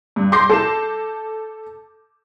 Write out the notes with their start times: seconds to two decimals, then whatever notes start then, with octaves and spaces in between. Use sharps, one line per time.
0.16 G2
0.32 C6 D6 G6 A#6 C7
0.50 A4 A5 E7